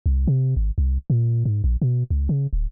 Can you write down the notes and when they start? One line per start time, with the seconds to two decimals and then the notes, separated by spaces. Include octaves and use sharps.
0.06 C2
0.28 C3
0.57 G#1
0.78 C2
1.10 A#2
1.45 G#2
1.64 A#1
1.82 B2
2.10 C#2
2.29 C#3
2.53 D1